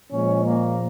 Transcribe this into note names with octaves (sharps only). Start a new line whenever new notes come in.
A#2 F3 G#3 C#4
A#3